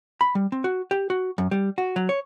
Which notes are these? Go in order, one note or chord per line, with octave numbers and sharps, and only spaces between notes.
B5
G3
C4
F#4
G4
F#4
F#2
G3
F#4
F#3
C#5